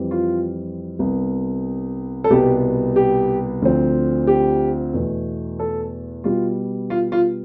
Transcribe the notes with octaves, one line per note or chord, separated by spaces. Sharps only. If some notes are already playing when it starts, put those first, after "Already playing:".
Already playing: F2 E3 G3 C4
F4
C2 C3 G3 B3
A4
C2 B2 G3 B3 G4
G4
D2 D3 F3 C4
G4
E2 B2 A3
A4
B2 G3 B3 F4
F4
F4